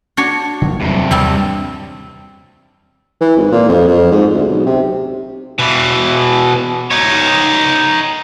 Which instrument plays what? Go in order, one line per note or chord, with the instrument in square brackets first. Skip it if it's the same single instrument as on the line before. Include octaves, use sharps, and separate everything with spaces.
[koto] D4 F#4 C#5
[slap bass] D3 F3 A#3
[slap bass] E2 F#3 [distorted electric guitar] G2 C3
[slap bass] D#2 [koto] G3 C4 A5
[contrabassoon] E3
G#1
A#2
F2
F2
G#2
D2
B1
C3
[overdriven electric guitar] B2 E3
D#4 C#5